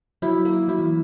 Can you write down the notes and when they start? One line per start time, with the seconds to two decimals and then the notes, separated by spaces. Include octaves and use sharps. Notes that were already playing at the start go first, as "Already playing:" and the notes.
0.22 F#3 E4
0.45 A#3
0.68 F#3 E4
0.79 E3